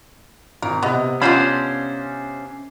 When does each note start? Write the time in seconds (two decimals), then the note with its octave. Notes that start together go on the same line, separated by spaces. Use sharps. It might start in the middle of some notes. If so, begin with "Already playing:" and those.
0.62 G#1 A#4
0.83 C3 B3 D#5
1.22 B3 C#4 D4 F4 C5 B5